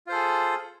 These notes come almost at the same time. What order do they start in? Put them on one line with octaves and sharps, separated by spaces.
F4 C5 A4 G#4